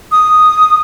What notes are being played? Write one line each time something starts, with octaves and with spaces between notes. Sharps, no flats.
D#6